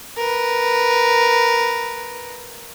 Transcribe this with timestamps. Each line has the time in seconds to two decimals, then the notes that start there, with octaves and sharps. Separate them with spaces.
0.17 A#4 B4